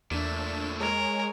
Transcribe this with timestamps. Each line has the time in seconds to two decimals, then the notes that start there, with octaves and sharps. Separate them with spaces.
0.11 E2 A#2 A3 D4 E7
0.80 G#3 A#4 C#5 G#5